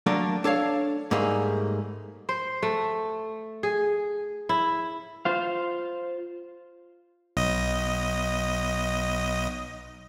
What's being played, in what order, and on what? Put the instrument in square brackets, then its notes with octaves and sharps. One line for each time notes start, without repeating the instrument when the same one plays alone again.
[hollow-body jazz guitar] F#3 A3 A#3 D4 A4 A#4
D4 A4 C#5 F5
G#2 G3 A3 A#3 G#4
[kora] C5
A3
G#4
E4
[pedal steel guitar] F4 C5 F5
[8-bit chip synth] B1 D#5